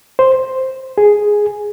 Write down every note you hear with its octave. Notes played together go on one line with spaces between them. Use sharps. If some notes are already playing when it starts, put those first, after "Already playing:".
C5
G#4